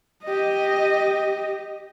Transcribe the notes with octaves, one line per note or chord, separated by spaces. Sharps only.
G4 D#5